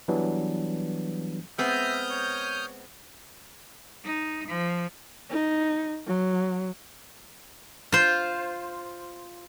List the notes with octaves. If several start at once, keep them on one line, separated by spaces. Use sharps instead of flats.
E3 F#3 G3 B3 D4
G#3 B3 C4 E5 D#6 F6 G6
C#5
D#4
F3
D#4
F#3
F4 C5